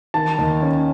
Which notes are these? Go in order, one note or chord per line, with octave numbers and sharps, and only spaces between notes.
D#3 A5
D#2
C#4